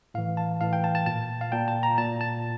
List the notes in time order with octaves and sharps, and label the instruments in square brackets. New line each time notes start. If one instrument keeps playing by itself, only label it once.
[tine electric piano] A2 E3 F5
A5
A2 E3 F5
G5
A5
A5
A#2 A5
F5
A#2 G5
A5
A#5
A#2 A5
A5